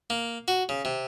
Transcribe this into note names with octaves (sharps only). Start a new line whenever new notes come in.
A#3
F#4
C#3
C3